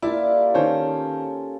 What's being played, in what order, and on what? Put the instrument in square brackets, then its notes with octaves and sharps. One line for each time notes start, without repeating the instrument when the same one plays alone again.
[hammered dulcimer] A#3 F4 G4 [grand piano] E4 [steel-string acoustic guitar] D5 A5
[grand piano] D#3 C5 C#5 [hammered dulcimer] C#4 A4